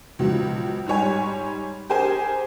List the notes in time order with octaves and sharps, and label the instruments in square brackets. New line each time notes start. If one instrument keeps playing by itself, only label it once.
[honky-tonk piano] C#2 F3 F#3
G#2 G3 C#5 G#5
G4 G#4 A#4 C5 G#5